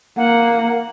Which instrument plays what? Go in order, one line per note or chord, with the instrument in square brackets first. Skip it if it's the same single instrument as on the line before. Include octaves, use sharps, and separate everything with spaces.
[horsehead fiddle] A#3 [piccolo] F#5